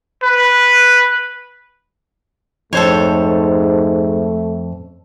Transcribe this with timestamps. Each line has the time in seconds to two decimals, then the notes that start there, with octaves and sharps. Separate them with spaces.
0.23 B4
2.73 F2 G#2 A3 A4 C5 C#5